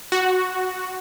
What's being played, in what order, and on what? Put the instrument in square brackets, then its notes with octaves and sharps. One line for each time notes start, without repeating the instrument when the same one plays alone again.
[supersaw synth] F#4